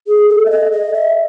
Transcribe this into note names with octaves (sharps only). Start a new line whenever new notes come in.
G#4
A4
E5
D#5
D#5
E5